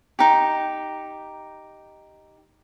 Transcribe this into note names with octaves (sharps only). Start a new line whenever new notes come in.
D#4 G4